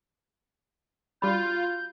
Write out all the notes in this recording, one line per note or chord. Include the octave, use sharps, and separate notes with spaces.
G3 D4 F4 F#4 B5 G6